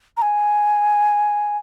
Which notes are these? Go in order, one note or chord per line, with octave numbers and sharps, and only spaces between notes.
A#5
G#5